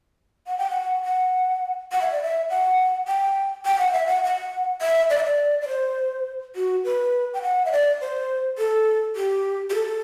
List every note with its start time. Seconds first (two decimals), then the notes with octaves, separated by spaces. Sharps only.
0.47 F#5
0.58 G5
0.70 F#5
1.05 F#5
1.92 F#5
2.01 E5
2.12 D5
2.22 E5
2.50 F#5
3.08 G5
3.66 G5
3.79 F#5
3.93 E5
4.07 F#5
4.24 F#5
4.82 E5
5.10 D5
5.18 E5
5.25 D5
5.62 D5
5.68 C5
6.56 F#4
6.84 B4
7.34 G5
7.42 F#5
7.65 E5
7.72 D5
8.01 C5
8.58 A4
9.16 G4
9.70 G4
9.75 A4